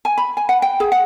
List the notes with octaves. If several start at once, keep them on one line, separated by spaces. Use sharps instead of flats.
G#5
B5
G#5
F#5
G5
G#4
F#5